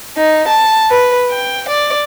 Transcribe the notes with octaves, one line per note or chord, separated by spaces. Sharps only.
D#4
A5
B4
G5
D5